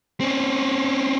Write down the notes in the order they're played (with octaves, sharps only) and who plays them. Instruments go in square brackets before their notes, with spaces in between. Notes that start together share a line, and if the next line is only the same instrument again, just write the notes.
[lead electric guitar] C4 C#4